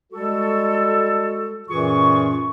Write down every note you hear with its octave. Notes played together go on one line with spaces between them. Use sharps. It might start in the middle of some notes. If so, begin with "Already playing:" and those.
G3 G#3 F#4 A4
F#2 A#2 E3 F4 G#4 C#6